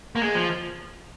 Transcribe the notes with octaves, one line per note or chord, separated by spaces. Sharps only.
A#3
G#3
F3